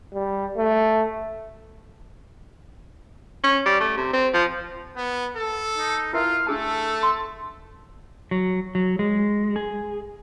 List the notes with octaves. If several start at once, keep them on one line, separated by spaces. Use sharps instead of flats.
G3
A3
C#4
G3
A3
C3
C4
F3
B3
A4
D#4
E4 F4 A#4 E5 F5
A3 D4 G#4 A4 A5
C6
F#3
F#3
G#3
G#4